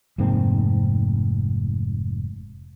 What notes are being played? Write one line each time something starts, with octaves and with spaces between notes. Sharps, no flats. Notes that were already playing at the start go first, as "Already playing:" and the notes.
F1 G#2 A#3 C4